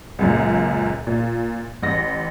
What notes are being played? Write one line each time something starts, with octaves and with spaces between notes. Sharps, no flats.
C#2 F#2 A#2
A#2
A1 A#6